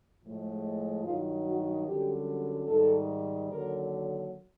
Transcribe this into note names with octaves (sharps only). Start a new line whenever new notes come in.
A2 F3 G#3
G2 D#3 F#3 F4
F#4
F#2 D3 G3 G4
G#2 D#3 G3 A4
D#2 D3 F#3 A#4